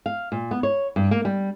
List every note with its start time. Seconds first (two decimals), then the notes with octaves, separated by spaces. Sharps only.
0.06 F5
0.32 A#2
0.51 B3
0.63 C#5
0.96 G2
1.11 A#3
1.25 G3